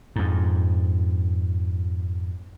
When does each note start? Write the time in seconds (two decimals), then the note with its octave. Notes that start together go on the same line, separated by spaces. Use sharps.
0.16 F2 G#2